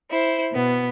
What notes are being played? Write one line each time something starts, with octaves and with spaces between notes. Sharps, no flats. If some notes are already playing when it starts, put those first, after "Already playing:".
E4 C5
B2 B3